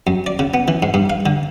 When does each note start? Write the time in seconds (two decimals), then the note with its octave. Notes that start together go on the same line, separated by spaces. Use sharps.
0.07 F#2
0.26 D5
0.39 C#3
0.54 B3
0.68 E3
0.83 G#2
0.94 G2
1.10 F5
1.26 D3